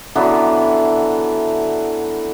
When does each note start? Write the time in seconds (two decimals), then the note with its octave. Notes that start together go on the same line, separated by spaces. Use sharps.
0.16 D3 E3 F#3 B3